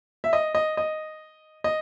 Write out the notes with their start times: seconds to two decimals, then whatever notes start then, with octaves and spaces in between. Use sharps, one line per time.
0.24 E5
0.33 D#5
0.55 D#5
0.77 D#5
1.64 D#5